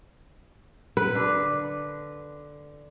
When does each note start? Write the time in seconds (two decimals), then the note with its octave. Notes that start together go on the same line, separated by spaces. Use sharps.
0.97 B4
1.15 D3